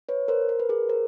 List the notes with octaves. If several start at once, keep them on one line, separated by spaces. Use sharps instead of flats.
B4 C#5
A#4 C5
A#4
B4
G#4 A#4
A#4 C5